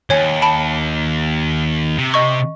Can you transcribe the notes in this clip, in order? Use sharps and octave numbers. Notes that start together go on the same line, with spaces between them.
D#2 C#5 G#5
A5 B5 D7
C3
D#5 C#6